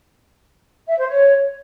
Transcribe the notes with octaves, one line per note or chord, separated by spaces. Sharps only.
E5
C5
C#5